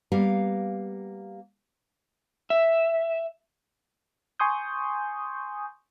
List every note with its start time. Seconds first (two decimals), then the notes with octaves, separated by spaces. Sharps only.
0.12 G3 A#3 B3 F5
2.50 E5
4.39 G#5 C6 C#6 D#6 G6